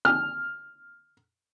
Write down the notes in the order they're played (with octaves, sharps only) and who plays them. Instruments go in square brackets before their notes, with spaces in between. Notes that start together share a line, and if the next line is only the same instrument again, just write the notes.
[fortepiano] F6